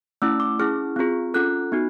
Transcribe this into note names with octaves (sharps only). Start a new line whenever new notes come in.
A3 C#4 E4 E6
D6
C#4 E4 G#4 F6
C4 F4 G#4
C#4 F4 A4 F#6
B3 D#4 F#4